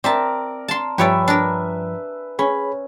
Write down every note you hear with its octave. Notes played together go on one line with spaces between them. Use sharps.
C4 A#4 D5 E5 A5
A5 C6
G2 F3 G4 B4 C#5 D5 E5 G#5
D4 A#4
C#4 G#4 B5